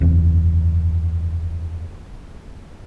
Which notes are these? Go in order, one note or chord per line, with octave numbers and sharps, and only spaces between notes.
F#1 E2 C4